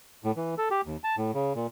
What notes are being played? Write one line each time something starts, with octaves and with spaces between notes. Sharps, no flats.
A2
E3
A4
G4
D#2
A5
A2
C#3
A#2